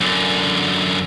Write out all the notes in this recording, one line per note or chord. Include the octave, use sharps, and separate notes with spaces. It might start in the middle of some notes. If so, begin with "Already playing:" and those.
F#2 D3